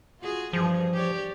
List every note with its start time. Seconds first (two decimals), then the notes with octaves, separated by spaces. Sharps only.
0.20 F4 F#4 G#4
0.53 G2 E3 F3 G#4
0.94 G4 C#5 D5